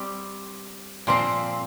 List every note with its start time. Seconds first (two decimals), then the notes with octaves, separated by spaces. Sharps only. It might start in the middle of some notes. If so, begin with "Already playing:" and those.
Already playing: G3 C4 G4
1.07 A#2 F3 C4 C6